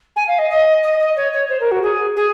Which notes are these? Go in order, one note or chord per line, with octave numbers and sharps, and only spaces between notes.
G#5
F5
D#5
D#5
D#5
D#5
C#5
C#5
C5
A#4
F#4
G#4
G#4